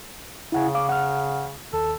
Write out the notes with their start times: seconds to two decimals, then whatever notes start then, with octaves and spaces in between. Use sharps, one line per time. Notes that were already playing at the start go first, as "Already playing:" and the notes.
0.52 C#3 E4 F#5 G#5
0.75 F5 D6
0.89 F#5 F6
1.73 D#2 A4